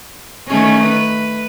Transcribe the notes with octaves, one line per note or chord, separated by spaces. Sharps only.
D#3 A3 C#4
B4